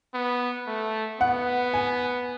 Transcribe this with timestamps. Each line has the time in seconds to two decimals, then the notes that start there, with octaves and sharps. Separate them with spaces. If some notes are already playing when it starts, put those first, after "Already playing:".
0.14 B3
0.67 A3
1.21 B3 F#5
1.74 G#5